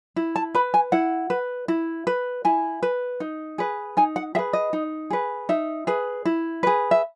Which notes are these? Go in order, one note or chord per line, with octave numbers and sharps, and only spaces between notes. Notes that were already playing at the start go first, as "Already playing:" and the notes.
E4
A5
B4 B5
G#5
E4 F#5
B4
E4
B4
E4 G#5
B4
D#4
G#4 B4
D#4 G#5
F#5
G#4 B4 E5
D#5
D#4
G#4 B4
D#4 E5
G#4 B4
E4
G#4 B4
E5